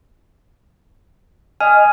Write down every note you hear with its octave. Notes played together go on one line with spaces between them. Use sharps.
D#5 G#5 F6